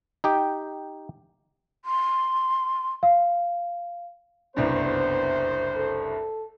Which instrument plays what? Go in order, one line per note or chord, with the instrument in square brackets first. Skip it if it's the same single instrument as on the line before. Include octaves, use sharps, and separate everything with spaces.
[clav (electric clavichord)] D#4 G4 G5
[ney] C6
[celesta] F5
[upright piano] F#1 C2 G2 [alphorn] B3 [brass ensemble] C5
[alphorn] A4